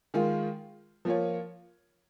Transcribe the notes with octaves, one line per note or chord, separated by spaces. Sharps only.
D#3 G#3 F4
F3 A#3 F4 C#5